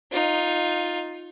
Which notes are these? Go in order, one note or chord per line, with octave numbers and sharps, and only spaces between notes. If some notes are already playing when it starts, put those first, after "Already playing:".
D#4 F4